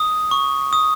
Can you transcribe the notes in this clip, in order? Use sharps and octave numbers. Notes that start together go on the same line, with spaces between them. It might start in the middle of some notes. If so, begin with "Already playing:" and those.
Already playing: D#6
C#6
D#6